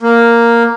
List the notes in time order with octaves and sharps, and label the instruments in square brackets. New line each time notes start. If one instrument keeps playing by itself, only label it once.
[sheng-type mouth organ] A#3